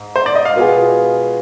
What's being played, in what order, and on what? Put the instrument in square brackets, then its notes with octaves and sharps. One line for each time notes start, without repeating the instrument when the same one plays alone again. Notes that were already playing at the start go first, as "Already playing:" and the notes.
Already playing: [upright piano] G#2
[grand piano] C5
D5
D#5
F5
[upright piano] B2 B3 F4 G#4